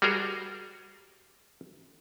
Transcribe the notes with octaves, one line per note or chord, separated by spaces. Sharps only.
G3 F#4 G#4 A#4 C5